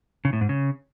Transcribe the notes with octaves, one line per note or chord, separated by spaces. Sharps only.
C#3
A2
G#2
C#3